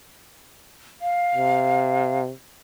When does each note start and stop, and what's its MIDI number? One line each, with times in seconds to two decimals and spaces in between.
1.02 2.19 77
1.35 2.31 48